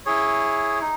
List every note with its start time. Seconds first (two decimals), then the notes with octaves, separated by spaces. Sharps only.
0.05 E4 G#4 C#5
0.81 D#4